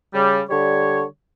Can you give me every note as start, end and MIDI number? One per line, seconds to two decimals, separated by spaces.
0.14 0.41 49
0.14 0.41 55
0.50 1.03 50
0.50 1.03 55
0.50 1.03 73